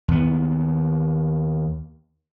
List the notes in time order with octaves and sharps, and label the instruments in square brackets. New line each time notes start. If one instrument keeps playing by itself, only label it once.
[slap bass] D#2 B3